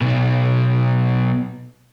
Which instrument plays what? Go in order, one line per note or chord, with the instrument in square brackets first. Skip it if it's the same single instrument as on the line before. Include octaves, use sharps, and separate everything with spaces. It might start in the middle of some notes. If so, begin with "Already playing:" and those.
[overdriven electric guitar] B1 B2